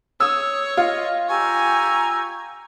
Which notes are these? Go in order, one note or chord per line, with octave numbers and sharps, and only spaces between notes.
C#5 D#6 E6
F4 D#5
G4 G#5 A#5 C#6 E6